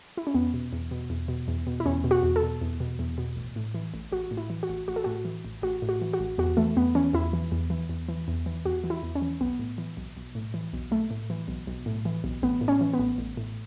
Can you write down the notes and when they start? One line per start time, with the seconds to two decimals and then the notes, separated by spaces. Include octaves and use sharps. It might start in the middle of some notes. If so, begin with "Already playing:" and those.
0.17 E4
0.27 C#4
0.34 E2 B3
0.54 B2
0.73 E2
0.91 B2
1.10 E2
1.28 B2
1.48 E2
1.67 B2
1.80 E4
1.86 E2 C#4
2.04 B2
2.11 F#4
2.23 E2
2.36 A4
2.42 B2
2.62 E2
2.80 B2
2.99 E2
3.18 B2
3.36 A1
3.56 A2
3.74 E3
3.94 A1
4.12 A1 F#4
4.31 A2
4.37 E4
4.50 E3
4.63 F#4
4.69 A1
4.88 A1 F#4
4.96 A4
5.04 A2 F#4
5.25 E3
5.45 A1
5.62 A1 F#4
5.82 A2
5.89 F#4
6.01 E3
6.13 F#4
6.19 A1
6.38 E2 F#4
6.57 E3 A3
6.76 E2 B3
6.95 E3 C#4
7.13 E2 E4
7.33 E3
7.52 E2
7.70 E3
7.89 E2
8.09 E3
8.28 E2
8.46 E3
8.65 E2 F#4
8.84 E3
8.90 E4
9.03 E2
9.15 C#4
9.22 E3
9.41 B1 B3
9.59 A2
9.78 E3
9.97 B1
10.17 B1
10.35 A2
10.54 E3
10.73 B1
10.91 B1 A3
11.11 A2
11.30 E3
11.48 B1
11.67 B1
11.86 A2
12.05 E3
12.24 B1
12.43 A1 B3
12.61 A2
12.68 C#4
12.81 E3
12.94 B3
12.99 A1
13.18 A1
13.37 A2